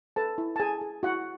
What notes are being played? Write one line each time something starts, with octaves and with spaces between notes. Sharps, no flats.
A4 B4 A5
E4
A5
G#4 G#5
G#4
E4 F#4 F#5